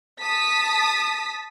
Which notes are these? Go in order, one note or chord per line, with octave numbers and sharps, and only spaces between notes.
A5 D#6 B6